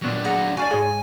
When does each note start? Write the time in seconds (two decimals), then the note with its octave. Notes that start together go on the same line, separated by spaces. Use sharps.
0.02 A#2 F#3 B3 D4 F#4
0.25 G#4 F#5 A#5
0.57 F#4 D5 F5 G#5 A5
0.70 G#2 G#3 G#4 C#5 D#5